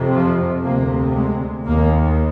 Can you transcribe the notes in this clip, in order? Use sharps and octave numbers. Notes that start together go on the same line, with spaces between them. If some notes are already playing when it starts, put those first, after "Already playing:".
Already playing: F2 C3
F3
D2 C3 A#3
G#3
D#2 A#3